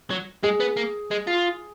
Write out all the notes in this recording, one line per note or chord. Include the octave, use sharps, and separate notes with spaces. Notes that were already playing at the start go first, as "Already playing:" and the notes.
F#3
G#3 G#4
B3
A#3
G#3
F4